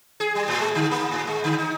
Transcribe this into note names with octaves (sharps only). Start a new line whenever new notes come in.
G#4
G3
A2
G#3
D3
A#3
A2
G#3
D3
D#4